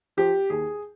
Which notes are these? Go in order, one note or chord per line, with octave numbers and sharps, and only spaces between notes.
F3 G4
D#2 G#4